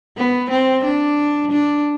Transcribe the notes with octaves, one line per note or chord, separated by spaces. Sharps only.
B3
C4
D4
D4